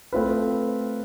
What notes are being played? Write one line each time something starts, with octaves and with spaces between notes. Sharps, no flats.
A3 C4 F4 B4